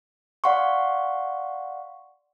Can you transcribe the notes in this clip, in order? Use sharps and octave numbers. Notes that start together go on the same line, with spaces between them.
D5 F5 F#5 C6 C#6